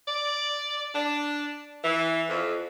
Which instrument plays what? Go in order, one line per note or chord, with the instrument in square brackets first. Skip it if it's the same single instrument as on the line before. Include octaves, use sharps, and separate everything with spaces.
[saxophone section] D5
D4
E3
F2